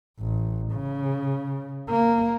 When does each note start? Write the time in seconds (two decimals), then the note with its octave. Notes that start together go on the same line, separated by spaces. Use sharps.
0.19 A1
0.73 C#3
1.89 A#3